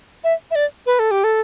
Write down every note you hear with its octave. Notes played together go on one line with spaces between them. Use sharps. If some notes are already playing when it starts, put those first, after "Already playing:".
E5
E5
D5
B4
A4
G4
A4